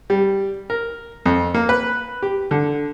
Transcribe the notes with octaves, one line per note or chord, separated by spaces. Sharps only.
G3
A#4
F2
A#3
B4
G4
D3